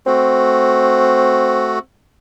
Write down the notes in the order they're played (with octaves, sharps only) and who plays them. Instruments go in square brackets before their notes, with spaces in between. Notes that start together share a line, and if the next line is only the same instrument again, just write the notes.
[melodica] A3 F#4 [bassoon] C4